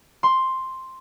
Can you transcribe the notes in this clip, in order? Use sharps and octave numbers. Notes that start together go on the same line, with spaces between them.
C6